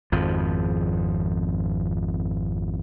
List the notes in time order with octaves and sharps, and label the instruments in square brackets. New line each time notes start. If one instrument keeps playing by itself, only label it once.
[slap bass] G#1 F2 F3